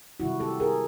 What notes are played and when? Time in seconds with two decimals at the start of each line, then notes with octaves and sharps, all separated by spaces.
0.20 C3 D#3 G3 E4 F#4
0.40 G4 A4
0.60 G#4 A#4